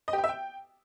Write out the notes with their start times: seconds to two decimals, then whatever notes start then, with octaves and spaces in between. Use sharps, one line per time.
0.08 D#5
0.13 G4
0.18 G5
0.24 E5
0.29 G5